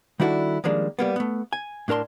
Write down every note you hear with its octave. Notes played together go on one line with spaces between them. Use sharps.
D#3 G3 D4 E4 F#4 A4
D#3 F3 G3 G#3 A#3 D4
G3 A#3 B3
A3 B3
G#5
A2 D4 A#4 A5 C6